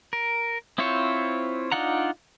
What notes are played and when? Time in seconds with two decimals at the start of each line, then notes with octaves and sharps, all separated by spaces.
0.13 A#4
0.78 C4 E4 F4 C5 C#5
1.72 D4 D#4 F4 F#5 A#5